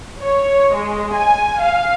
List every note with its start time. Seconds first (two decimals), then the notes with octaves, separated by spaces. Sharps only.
0.21 C#5
0.73 G#3
1.15 G#5
1.61 F5